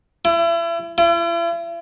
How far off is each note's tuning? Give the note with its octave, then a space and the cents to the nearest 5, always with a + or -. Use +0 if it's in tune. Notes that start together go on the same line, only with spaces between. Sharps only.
E4 +35
E4 +45